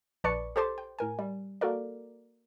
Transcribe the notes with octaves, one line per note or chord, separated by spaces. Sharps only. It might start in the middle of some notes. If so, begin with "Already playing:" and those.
A#1 B4 D5 A5 C#6 C#7
G4 A4 C5 A5 C6 D6
G5
A2 A#4 G#5
G3
A#3 F#4 A4 A#4 D5